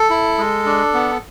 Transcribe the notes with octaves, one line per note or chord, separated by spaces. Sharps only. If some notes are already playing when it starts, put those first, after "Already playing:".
Already playing: A4
E4
G#3
D4
B3